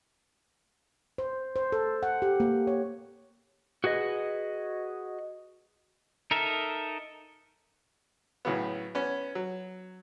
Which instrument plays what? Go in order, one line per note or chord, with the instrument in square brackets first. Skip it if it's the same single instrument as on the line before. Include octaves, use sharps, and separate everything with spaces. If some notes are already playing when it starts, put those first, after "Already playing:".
[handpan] C5
C5
A4
F#5
G4
A#3
C#5
[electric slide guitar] F#4 G#4 B4 D#5
[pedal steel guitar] D#4 A4 A#4 E5
[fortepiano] A2 C#3 F#3 B3
B3 C#4
F#3